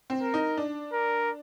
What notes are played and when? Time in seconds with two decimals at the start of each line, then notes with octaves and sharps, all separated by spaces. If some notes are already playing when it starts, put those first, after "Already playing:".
0.10 C4
0.22 A#4
0.34 D#4
0.57 D4
0.93 A#4